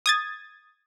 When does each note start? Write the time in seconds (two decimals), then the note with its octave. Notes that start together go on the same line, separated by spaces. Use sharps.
0.06 D#6 G#6 A6